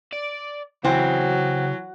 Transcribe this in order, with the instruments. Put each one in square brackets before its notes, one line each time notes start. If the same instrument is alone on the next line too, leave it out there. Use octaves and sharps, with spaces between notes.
[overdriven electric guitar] D5
[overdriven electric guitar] C#3 [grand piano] E3 [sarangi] F#3 [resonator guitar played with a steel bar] C4